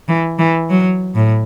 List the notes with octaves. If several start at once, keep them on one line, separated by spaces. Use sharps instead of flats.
E3
E3
F#3
A2